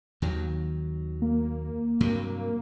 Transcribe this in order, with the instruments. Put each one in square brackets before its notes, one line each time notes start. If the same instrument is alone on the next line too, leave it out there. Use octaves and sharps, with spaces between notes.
[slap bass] D#2 D#3 F#3
[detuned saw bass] A#3
[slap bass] G2 C3 F#3